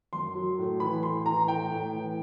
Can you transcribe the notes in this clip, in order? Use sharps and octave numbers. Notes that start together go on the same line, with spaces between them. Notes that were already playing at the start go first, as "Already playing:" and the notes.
F#2 C6
F#3
A2
E3 B5
A2 C6
E3 A#5
A2 G5
A2
E3